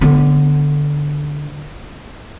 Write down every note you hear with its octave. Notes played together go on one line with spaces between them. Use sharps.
D3 B3